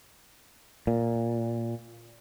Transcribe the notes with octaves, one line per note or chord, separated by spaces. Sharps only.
A#2